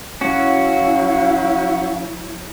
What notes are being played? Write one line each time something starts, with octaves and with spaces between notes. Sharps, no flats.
F#3 C#4 E4 F#4 F5